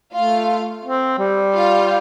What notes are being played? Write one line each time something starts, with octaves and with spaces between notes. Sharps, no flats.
A3 F4 F5
C4
G3
F4 F5